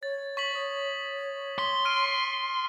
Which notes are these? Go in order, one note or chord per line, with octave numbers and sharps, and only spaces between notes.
C#5 A6
C#6 B6 F#7
C#5 D#6
C6 B6 G7
F6 D7 D#7